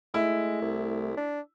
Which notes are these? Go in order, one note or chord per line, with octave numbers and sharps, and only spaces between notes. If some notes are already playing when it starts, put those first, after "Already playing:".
G#3 A3 E4
C2
D4